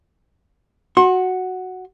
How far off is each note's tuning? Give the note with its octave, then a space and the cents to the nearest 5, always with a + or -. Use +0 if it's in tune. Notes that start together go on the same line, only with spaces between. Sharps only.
F#4 +0 C6 +35